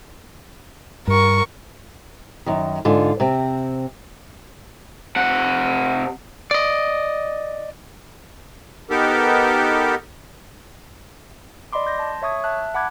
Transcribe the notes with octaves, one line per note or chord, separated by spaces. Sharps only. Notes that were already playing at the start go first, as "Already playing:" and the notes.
G2 A#4 C#6
F#2 D#3
G#2 D3 F4
C3 C4
C3 F#5
D5 D#5
B3 D#4 G4 A4 A#4
D5 D#5 B5 C6 D6
C6 G6 A#6
A5
C#5 E5 C#6 D#6 G#6
E5 A5 F#6
F#5 A5 B5 D6 F#6 G#6